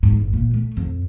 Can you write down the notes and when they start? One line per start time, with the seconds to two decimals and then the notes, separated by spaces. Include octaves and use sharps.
0.03 G#2
0.20 G1
0.33 A#2
0.54 A3
0.77 F2